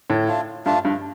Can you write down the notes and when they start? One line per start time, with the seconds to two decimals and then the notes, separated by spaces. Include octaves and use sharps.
0.10 A2
0.28 A3 D4 F4
0.66 G2 A3 D4 F4
0.85 G2